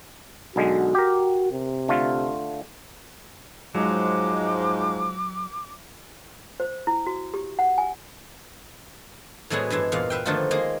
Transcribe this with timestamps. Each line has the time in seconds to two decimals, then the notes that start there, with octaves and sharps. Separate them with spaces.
0.56 B1 D3 G#3 F#4
0.95 G4 A#4
1.52 C3
1.88 D3 A3 F4
3.75 G#2 F3 F#3 G#3 D6
6.60 C5
6.87 E4
7.07 F#4
7.34 G4
7.59 F#5
7.78 G#5
9.50 A2 F#3 G#3 B3 E4 G#4
9.70 G2 E3 G#3 E5
9.92 E2 A#2 F5
10.10 B4 E5 F5 G5
10.26 D3 D#3 F3 A3 D#4 F4
10.51 G#3 A#3 D#4 G#4